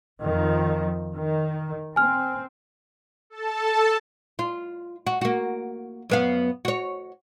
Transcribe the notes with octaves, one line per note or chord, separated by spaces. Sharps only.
F2 D#3 F3
D#3
C4 G#5 F6
A4 A5
F4
F#4
A#3 F#4
F#2 B3 F5
F#4 C#5